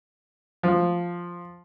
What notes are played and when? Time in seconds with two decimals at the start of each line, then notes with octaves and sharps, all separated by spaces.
0.63 F3